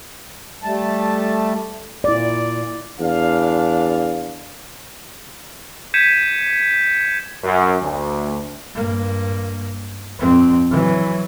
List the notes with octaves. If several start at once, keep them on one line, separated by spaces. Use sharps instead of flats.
G3 A3 A5
A#2 E4 D5
E2 D4 F5
G6 G#6 B6 C#7 D#7 E7
F#2
D2
G2 A#3
F2 C4
E3 F#3